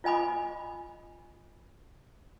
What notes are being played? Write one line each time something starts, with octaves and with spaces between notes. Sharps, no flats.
F4 D#5 G#5 B5 D6